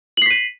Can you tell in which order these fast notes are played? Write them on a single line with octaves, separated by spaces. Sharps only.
F#7 C7 B6 D#7